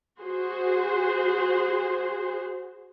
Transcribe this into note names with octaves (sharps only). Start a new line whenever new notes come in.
F#4 G#4 C5